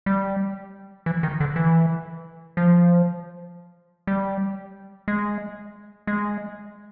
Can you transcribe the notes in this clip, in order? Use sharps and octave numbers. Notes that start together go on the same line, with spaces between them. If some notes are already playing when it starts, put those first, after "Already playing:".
G3
E3
D#3
D3
E3
F3
G3
G#3
G#3